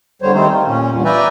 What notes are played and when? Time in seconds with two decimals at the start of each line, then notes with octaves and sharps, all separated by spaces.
0.22 E2 D3 G3 C5 C#5
0.34 D#3 G3 A3 C4 D#4 C5
0.52 F4
0.67 A#2 C#4
0.91 E2 G2 A#2
1.05 B4 D5 E5 G5 G#5 A#5